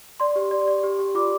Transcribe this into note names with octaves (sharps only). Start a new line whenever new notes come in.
D5 C6
G4
D5
D5
G4
G4
F4 D6